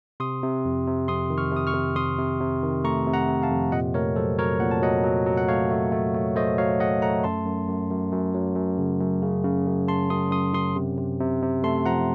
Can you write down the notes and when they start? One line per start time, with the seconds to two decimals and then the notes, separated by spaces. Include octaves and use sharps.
0.20 C3 C6 D#6
0.42 C3
0.65 F2
0.87 C3
1.08 F2 C6 D#6
1.30 D#3
1.38 C#6 F6
1.52 C3 D#6
1.67 C#6 F6
1.74 C3
1.96 C3 C6 D#6
2.18 C3
2.41 C3
2.63 D#3
2.84 A3 A#5 C#6
3.07 C3
3.13 F#5 A#5
3.29 C3
3.43 F5 A5
3.50 F2
3.72 A#2 D#5 F#5
3.94 A3 A#4 C#5
4.16 F#3 A4 C5
4.38 F#3 A#4 C#5
4.60 A#2 F#5
4.71 A5
4.82 F#3 D#5 F#5
5.04 F#3
5.26 F#3
5.37 F#5
5.48 A3 C#5 F5
5.71 A3
5.93 A3
6.14 A3
6.36 A3 C5 D#5
6.58 F#3 C#5 F5
6.80 A3 D#5 F#5
7.02 A3 F#5 A#5
7.24 F#2 A5 C6
7.46 F#2
7.68 F#2
7.91 F#2
8.12 F#2
8.34 F#3
8.56 F#2
8.78 C#3
9.01 F#2
9.23 C#3
9.44 C#3
9.67 F#2
9.88 C#3 A5 C6
10.10 F#2 C6 D#6
10.32 F#2 C6 D#6
10.54 F#2 C6 D#6
10.76 C3
10.98 C3
11.20 C3
11.42 C3
11.64 A3 A5 C6
11.85 F3 F#5 A#5